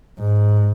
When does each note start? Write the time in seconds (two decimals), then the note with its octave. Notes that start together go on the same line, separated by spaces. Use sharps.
0.20 G#2